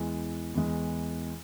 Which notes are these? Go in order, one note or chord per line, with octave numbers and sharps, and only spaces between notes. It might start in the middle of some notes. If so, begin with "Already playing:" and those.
Already playing: E2 E3 G#3
E2 E3 G#3